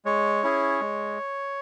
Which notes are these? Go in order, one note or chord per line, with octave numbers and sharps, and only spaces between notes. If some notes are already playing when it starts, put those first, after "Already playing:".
G#3 C#5
C#4 E4 G#4
G#3